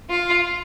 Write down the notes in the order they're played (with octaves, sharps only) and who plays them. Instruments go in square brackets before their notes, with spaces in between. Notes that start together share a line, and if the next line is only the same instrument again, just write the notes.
[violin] F4